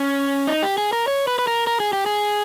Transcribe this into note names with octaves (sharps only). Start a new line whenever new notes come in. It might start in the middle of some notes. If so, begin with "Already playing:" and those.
Already playing: C#4
D#4
G4
G#4
A#4
C#5
B4
B4
A#4
A#4
G#4
G4
G#4